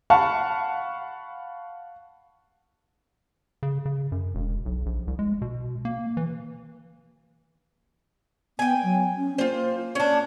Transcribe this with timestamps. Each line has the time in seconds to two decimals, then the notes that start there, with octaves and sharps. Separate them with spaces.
0.10 F5 F#5 A5 B5 C#6 F6
3.63 C#3
3.85 C#3
4.12 F#2
4.35 E1
4.66 B1
4.86 A#1
5.07 C2
5.19 G#3
5.42 B2
5.85 A#3
6.17 E3
8.59 B3 G5 G#5
8.83 F#3
9.17 C#4
9.38 A#3 F4 C5
9.95 C#4 D4